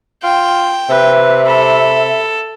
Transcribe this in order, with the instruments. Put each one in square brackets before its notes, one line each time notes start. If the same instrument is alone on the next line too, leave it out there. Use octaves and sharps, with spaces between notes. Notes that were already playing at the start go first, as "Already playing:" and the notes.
[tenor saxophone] F4 [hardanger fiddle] G5
[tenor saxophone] C3 [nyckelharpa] B4 [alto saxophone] E5
[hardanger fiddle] A4 [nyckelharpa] B5